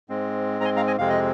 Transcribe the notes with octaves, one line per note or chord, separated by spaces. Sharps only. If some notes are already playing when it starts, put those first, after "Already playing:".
G#2 G#3 C4
A#5
G#5 C6
F5 A#5
D#5 G#5
F2 C3 G#3 C4 F5
D#5